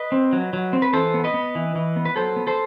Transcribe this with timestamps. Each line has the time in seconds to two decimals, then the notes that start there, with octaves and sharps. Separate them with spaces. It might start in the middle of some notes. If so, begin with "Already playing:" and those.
Already playing: B4 D#5
0.12 C4
0.33 F#3
0.53 F#3
0.73 C4
0.82 B4
0.93 E3 A4 C5
1.14 B3
1.24 B4 D#5
1.34 B3
1.55 E3
1.75 E3
1.96 B3
2.05 B4
2.16 F#3 A4 C5
2.36 B3
2.47 A4 C5